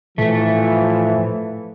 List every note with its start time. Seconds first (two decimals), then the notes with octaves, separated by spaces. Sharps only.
0.18 A2 E3 F3 A3